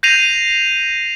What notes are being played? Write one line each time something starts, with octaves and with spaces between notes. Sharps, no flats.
G6 A#6 C7 D#7 F7